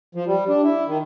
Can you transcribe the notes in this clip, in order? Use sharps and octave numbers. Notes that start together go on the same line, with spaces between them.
F3
G3
D4
E4
D#3